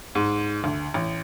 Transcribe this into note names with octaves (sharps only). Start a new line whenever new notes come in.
G#2
D2
A1